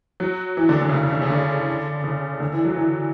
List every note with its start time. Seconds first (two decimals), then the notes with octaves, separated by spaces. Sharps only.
0.20 F#3
0.57 E3
0.69 D3
0.81 D3
0.89 C#3
0.94 D3
1.03 C#3
1.12 D3
1.22 C#3
1.30 D3
2.04 C#3
2.40 D3
2.53 E3
2.65 F#3
2.77 E3